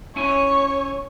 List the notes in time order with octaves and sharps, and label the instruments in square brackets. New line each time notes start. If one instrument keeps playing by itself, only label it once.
[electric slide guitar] C#4 E4 G#5 [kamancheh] C#5 [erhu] C#6